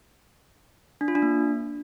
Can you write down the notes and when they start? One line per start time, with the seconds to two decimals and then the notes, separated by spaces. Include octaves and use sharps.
1.01 D4
1.08 F4
1.15 D4
1.22 A#3